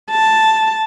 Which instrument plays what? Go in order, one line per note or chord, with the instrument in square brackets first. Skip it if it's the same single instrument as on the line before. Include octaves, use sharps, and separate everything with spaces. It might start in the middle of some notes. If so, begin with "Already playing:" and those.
[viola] A5